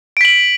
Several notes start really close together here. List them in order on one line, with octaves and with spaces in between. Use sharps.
D7 B6 F#7